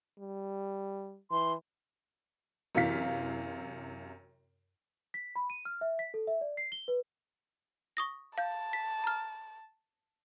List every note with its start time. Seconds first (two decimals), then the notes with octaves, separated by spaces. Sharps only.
0.19 G3
1.31 E3 C6
2.75 F#2 C3 E3 F5 B6
5.14 B6
5.36 B5
5.50 D#7
5.65 F6
5.81 E5
5.99 B6
6.14 A4
6.27 E5
6.41 D5
6.57 C7
6.72 G7
6.88 B4
7.97 C#6 D#6 A#6
8.38 F5 A5 G6
8.73 B6
9.04 A#5 F6